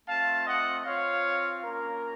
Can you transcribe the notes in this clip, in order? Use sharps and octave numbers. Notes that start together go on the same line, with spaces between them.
A3 C4 F4 F5 A5
D#5 F#5
C4 F4 C#5 F5
A#3 C#4 F4 A#4